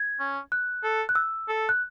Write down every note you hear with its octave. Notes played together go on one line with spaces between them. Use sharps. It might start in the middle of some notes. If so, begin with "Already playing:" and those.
Already playing: G#6
C#4
F#6
A4
F#6
E6
A4
F#6